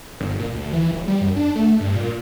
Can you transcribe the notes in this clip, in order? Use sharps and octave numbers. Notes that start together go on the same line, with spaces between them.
G1
A#2
D2
E3
D#1
G3
F#2
D4
A3
G2
A#2